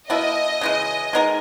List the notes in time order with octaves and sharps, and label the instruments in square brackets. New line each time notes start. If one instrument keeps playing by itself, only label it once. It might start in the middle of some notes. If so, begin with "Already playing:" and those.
[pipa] B2 A#3 E4 [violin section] D#5
[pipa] C#3 E3 G#3
G#3 B3 D#4 A#4